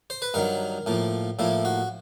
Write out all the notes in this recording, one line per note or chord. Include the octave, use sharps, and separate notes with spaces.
C5
B4
G2 D#3 F#3 A#4
A2 F3 A#3
A2 F3 A#3 E4
F#4